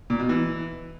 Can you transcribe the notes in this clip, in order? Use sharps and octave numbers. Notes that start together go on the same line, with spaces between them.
A#2
B2
E3